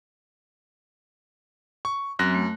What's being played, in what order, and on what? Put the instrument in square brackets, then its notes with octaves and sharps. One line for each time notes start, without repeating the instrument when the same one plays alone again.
[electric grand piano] C#6
[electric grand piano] F#2 F#6 A#6 [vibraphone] F#3 C4
[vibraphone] A3